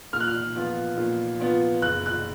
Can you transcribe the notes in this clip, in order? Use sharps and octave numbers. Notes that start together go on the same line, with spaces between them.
A#2 F6
F#6
F6
F3 B3 F4
A#2
F3 B3 F4
F#1 F#6
F#6